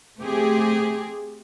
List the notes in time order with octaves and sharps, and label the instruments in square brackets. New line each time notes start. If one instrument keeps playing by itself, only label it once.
[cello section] A3 C4 G4 G#4